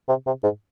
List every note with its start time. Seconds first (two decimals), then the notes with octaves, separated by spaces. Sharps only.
0.09 C3
0.27 C3
0.43 G#2